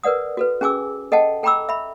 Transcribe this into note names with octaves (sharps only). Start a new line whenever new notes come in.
A#4 B4 D5 F#5 D#6
F#4 A4 B4
C#4 G#4 G#5 D6 E6
A4 D#5 F#5 G5 A5
A4 G5 A#5 B5 D6 E6
E5 B5